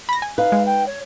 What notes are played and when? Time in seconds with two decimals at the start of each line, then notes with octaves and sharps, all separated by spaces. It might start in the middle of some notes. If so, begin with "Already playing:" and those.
0.09 B5 A#6
0.22 G#5
0.38 D#4 B4 F5
0.52 G#3
0.66 G5
0.86 C#5